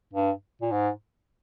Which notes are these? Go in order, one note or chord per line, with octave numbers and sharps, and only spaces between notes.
G2
A#2
G#2